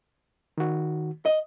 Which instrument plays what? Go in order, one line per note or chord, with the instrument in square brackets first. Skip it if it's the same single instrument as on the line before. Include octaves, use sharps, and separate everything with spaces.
[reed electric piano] D#3 F#4
[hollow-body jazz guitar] D#5